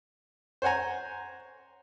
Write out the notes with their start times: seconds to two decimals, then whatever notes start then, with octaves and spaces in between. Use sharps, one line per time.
0.62 C5 C#5 F#5 G#5 A#5